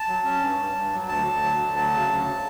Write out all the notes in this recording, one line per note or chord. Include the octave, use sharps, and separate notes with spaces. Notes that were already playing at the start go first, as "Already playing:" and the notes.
Already playing: A5
F#3
C#4
G2
G2
G2
F#3
D2 A5
D2
F#3
D2
F#3 A5
C#3
D2